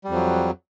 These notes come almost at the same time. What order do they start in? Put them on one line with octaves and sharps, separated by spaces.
G3 F2 F#3